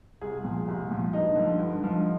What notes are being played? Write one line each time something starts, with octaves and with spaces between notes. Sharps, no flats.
C2 G#4
A#2 F3
C2
A#2 F3
G2 D#4
D3 F3
G2
D3 F3